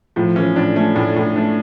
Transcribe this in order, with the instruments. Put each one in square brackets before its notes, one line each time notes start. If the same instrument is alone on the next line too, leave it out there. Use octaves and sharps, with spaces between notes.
[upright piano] A2 [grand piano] F3
[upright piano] E3 [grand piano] C#4
[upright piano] A2 [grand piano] D4
[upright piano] A3 [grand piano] C#4
[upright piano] A2 [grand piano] D4
[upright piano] A2
[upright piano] A3 [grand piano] D4